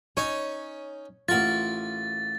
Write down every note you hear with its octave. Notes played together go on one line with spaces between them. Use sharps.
C#4 D#4 C#5 G#5
A1 F4 A#4 F#5 C#6 A6